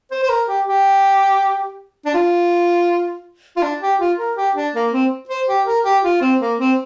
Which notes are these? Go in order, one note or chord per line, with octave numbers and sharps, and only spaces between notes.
C5
C5
A#4
G4
G4
D4
F4
F4
D4
G4
F4
A#4
G4
D4
A#3
C4
C5
G4
A#4
G4
F4
C4
A#3
C4